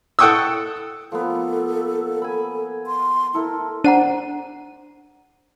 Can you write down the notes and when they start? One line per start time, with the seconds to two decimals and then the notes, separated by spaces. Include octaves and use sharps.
0.19 A4 F#5 G5 C#6 D#6 E6
1.12 F3 A#3 B3 A4
2.22 G#5 B5
2.87 C6
3.34 E4 A4 A#4
3.84 D4 C5 F#5 A#5 D#7